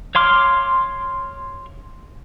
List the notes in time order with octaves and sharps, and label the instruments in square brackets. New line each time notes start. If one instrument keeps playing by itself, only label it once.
[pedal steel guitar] C#5 F5 C6 D6 F6